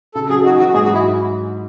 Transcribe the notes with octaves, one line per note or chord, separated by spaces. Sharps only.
C#3 A4
F#3 G#4
D#4 F#4
E3 F#4
G#2 G#4
F#4
F#3 E4